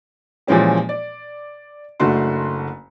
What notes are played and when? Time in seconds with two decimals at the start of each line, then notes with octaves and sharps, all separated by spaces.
0.47 A#2 E3 F3 G#3 C#4 G4
0.89 D5
2.00 F#1 A3 D4 F#4 C6